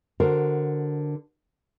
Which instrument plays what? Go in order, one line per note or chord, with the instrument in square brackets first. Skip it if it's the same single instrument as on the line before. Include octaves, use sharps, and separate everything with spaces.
[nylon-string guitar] D3 F#4 A#4 C5